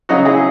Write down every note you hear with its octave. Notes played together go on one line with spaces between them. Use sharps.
C#3 F#3 D#4 F#4
E4 G#4